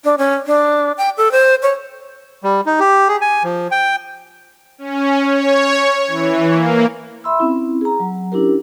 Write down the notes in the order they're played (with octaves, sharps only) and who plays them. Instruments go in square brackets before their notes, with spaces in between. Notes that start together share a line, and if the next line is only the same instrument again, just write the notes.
[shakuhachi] D4
C#4
D4
G5
A4
C5
C#5
[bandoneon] G3
D#4
G4
G#4
G#5
F3
G5
[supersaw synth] C#4
C#5
E3
A#3
[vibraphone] E5 B5 C6 E6
C4 C#4 E4
G#4 A#5
F#3
C#4 D4 E4 G4 A#4